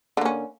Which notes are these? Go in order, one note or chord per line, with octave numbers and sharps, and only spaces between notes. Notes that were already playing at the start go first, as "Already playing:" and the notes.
D3 A#3 C#4